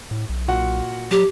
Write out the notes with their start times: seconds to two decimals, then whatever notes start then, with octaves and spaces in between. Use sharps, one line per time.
0.11 A2
0.29 B1
0.48 A#2 F#4 F#5
1.11 F#3 G4